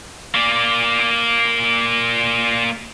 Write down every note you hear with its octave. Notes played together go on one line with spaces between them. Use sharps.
A#3 D5